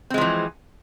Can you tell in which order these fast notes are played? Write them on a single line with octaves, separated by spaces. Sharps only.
C4 G#3 F3 E3